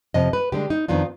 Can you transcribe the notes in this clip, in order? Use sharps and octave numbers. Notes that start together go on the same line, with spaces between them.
F2 C3 F3 D#5
B4
D3 G#3 D4 G4
D#4
F2 D#3 B3 D4 F4